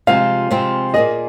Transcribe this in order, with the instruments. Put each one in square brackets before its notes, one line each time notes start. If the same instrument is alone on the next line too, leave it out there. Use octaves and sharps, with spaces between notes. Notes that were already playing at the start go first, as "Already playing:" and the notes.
[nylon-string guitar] C3 F3 G#3 C4 F4 [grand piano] F5
[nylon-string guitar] C3 F3 G#3 C4 F4
[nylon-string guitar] A#2 A#3 G#4 [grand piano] D#5